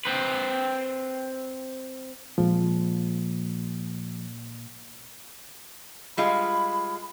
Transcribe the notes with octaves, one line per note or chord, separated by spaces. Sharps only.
C4 B4
A#2 F3 G#3
G3 G#3 F4 B5